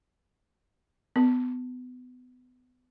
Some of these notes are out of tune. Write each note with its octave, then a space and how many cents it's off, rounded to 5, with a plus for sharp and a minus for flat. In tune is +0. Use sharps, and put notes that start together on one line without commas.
B3 +25